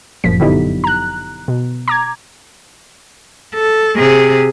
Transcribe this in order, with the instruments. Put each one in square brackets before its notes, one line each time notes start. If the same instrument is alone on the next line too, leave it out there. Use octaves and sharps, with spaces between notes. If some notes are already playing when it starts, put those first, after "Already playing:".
[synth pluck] G1 F#2 A#2 F3 B6
D3 F#3 B3 D#4 E4 G4
A#5 F#6
B2
A#5 D6 G#6
[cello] A4
C3 G#4